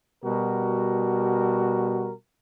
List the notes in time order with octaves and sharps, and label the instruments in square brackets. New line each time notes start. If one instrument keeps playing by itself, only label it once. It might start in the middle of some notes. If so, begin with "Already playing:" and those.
[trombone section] B2 G3 F#4 A#4